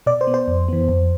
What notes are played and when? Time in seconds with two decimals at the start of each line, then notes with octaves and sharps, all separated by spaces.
0.06 B2 D5
0.21 C5
0.27 B3
0.34 C5
0.48 F2
0.68 E3 B3
0.89 F2